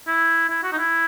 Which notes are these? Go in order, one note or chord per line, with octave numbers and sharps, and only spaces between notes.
E4
E4
F#4
D#4
E4